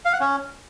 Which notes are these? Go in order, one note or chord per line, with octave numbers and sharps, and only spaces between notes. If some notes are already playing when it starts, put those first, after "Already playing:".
F5
F#5
C#4